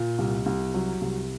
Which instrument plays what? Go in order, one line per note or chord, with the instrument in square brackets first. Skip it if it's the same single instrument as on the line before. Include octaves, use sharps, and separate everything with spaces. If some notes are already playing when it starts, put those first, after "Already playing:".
Already playing: [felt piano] A#2
C2
C2
F#3
C2